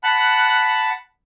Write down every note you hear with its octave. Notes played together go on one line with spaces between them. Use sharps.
F#5 A5 B5 F#6